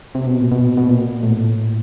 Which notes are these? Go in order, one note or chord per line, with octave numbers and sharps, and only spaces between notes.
C3
B2
A#2
B2
B2
A#2
A2